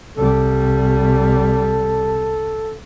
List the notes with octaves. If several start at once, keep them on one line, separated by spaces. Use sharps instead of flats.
C2 G3 A4